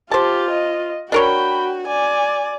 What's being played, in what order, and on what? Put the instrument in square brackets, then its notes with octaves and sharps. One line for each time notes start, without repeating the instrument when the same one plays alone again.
[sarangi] F4 [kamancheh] G4 [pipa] C5 A5
[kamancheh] D#5
[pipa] D4 A#4 C#5 [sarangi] F#4 [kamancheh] G5 B5
[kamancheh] D5 [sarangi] G#5